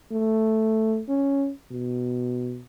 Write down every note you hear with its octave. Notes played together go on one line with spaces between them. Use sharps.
A3
C#4
B2